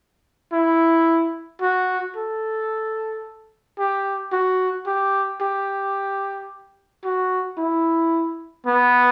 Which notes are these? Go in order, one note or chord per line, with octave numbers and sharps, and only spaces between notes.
E4
F#4
A4
G4
F#4
G4
G4
F#4
E4
B3